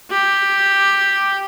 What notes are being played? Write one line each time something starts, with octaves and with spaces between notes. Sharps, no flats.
G4